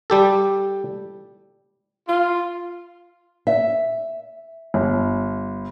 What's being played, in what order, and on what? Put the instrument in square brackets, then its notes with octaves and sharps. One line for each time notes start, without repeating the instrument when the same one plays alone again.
[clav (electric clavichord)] G3 G4 A4
[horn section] F4
[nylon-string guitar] E5
[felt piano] G1